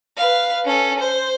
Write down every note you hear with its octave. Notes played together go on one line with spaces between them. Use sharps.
B4 F5
C#4 A4
C5